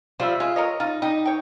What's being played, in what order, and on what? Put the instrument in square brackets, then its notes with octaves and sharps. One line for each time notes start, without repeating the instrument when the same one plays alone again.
[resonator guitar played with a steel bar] F3 G3 F4 [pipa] C5 E5
[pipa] G#3 [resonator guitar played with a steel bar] F4
[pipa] A#4 C#5 D#5
[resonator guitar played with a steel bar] D#4 [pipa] F4
[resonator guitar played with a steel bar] D#4 [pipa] G4
[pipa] C#5 G5